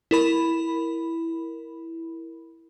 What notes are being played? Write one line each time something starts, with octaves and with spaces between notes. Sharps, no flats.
E4 A#4 B5